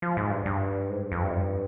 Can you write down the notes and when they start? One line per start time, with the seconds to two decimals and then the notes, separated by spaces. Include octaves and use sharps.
0.02 F3
0.17 G#2
0.31 G2
0.46 G2
0.90 G#2
1.01 G2
1.12 F2
1.23 G2
1.31 F2
1.39 G2